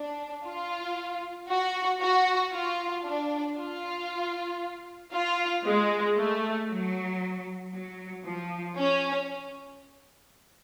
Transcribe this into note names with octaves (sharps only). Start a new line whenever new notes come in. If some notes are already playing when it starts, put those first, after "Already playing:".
Already playing: D4
F4
F#4
F#4
F4
D4
F4
F4
G#3
A3
F#3
F#3
F3
C#4